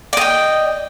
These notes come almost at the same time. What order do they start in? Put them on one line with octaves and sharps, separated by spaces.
D5 D#5 G5